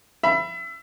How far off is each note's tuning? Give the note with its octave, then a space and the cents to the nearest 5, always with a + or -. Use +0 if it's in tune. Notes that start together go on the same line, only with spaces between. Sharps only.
E5 +30 B5 +0